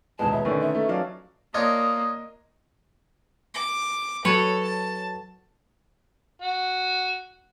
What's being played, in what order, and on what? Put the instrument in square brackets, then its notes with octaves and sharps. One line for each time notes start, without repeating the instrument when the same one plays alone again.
[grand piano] D#1 G#3 [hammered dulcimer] B2 [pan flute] A5
[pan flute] E5 [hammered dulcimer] B5
[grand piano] D3 D#3 A3 [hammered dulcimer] C#4 A#4
[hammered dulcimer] D#4 [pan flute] E5
[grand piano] A3
[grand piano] F#3 F5 [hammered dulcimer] A4 D5 A#5
[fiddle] A#3 [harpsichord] D4 F4 C#5 [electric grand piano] D#5 [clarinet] D#6
[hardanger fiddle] D6
[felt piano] F#3 [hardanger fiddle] A4 [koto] B4 C#5
[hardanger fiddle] A5
[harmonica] F#4